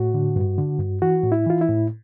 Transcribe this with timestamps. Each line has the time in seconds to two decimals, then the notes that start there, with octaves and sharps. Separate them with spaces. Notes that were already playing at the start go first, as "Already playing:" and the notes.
Already playing: A2 F#4
0.14 D3
0.36 G2
0.58 D3
0.79 G2
1.02 E3 F#4
1.23 A2
1.32 E4
1.46 E3 F4
1.61 E4
1.68 A2